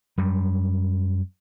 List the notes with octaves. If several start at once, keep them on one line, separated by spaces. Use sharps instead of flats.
F#2 G3